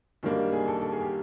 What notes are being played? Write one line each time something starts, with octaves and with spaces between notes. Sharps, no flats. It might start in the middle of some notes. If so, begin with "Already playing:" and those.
F#2 D#3 G3 A#3 D4
G#4
A4
A4
G#4
G4